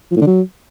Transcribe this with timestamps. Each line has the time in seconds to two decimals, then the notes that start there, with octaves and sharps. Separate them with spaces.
0.11 F3
0.16 A2
0.22 D3
0.27 F#3